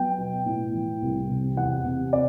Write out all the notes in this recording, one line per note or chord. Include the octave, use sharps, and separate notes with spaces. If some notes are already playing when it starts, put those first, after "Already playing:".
Already playing: F#3 B3 G5
B2
A2
E3
C2
C3
E2 F#5
C3
C4 D5